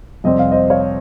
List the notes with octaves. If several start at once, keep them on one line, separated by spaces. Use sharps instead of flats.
F2 C3 G3 C4 D#5
F5
C5 D#5
C#5 F5